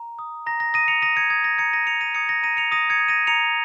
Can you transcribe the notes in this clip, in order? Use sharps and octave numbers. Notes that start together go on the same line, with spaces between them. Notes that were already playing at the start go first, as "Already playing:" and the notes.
Already playing: A#5
D#6
A#5 A#6
A#6
D#6 A#6 D#7
C#7 F7
D#6 A#6 D#7
G#6 C#7
D#6 G#6
A#6
A#5 G#6 C#7
A#6 D#7
D#6 C#7 F7
A#6 D#7
D#6 G#6 C#7
A#6
A#5 A#6 D#7
C#7 F7
D#6 A#6 D#7
G#6 C#7
D#6
A#6 D#7
A#5 C#7 F7